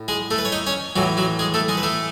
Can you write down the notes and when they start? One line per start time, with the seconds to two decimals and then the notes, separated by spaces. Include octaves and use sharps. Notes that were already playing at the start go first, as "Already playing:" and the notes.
Already playing: A2
0.08 G#3 G#4
0.31 A3 A4
0.38 B4
0.45 C#5
0.52 D#4 D#5
0.67 C#4 C#5
0.96 A2 E3 F#3 F#4
1.17 F#3 F#4
1.39 G#3 G#4
1.54 A3 A4
1.68 G#3 G#4
1.77 B4
1.83 A3 A4